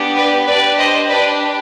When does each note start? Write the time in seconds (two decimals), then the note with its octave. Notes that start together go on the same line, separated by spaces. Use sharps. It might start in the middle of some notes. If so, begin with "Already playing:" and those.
Already playing: B3 D4 G4
0.16 B4 D5
0.47 D4 G4 B4 D5
0.78 C5 D#5
1.08 D4 G4 B4 D5